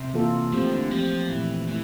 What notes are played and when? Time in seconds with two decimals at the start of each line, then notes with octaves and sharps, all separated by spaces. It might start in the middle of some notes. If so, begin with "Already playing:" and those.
Already playing: C3
0.14 E3 A#3 F4 A4
0.52 F3 A3 C4 G4
0.71 D3
0.91 F3 A3 C4 G4
1.29 A#2 E3 F3 A3
1.68 E3 A3